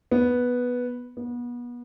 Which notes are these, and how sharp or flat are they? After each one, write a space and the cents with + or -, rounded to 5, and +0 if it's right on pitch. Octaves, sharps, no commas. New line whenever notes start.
B3 -5
B3 -30